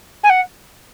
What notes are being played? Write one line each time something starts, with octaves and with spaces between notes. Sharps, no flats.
G#5
F#5